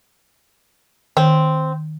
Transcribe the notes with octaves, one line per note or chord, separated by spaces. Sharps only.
D#3 C4